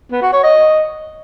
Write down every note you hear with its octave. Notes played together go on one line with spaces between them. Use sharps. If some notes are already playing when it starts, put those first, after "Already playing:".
B3
F#4
C#5
D#5